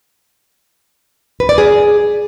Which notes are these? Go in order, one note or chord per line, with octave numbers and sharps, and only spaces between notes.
B4
D5
G#4